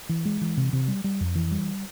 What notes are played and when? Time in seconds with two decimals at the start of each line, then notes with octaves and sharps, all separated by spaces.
0.09 E3
0.25 G#3
0.41 E3
0.57 C3
0.73 C3
0.88 G3
1.04 G3
1.21 F2
1.35 E3
1.51 G3